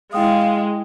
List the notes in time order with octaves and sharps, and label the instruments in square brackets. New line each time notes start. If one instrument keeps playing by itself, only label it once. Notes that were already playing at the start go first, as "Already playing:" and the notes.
[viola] G#3 [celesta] E4 G5 D#6 [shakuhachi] F5